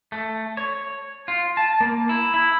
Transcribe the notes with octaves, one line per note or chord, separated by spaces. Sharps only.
A3
C#5
F4
A5
A#3
E4
E4